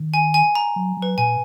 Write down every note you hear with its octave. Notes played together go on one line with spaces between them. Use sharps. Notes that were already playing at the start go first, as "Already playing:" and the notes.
Already playing: D#3
G#5
G#5
A#5
F#3
F#3
B4
A#2 G#5